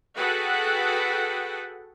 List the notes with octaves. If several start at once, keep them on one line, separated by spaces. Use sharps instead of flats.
F#4 G#4 A4 B4 F#5 G5